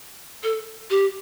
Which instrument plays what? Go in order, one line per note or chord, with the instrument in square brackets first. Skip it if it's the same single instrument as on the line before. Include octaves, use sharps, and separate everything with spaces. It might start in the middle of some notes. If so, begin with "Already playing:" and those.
[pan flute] A4
G4